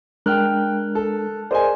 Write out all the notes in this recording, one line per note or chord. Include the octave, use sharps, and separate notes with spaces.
G#3 D4 A#4 G5 F6 F#6
A4
G#4 A#4 C5 D5 D#5 G#5